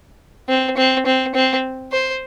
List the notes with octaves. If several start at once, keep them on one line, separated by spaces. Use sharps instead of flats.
C4
C4
C4
C4
C5